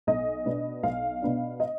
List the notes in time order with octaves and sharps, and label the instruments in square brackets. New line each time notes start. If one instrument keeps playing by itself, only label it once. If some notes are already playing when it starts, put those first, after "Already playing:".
[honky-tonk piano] B1 D#5
B2 B3 D4
B1 F5
B2 B3 D4
D#5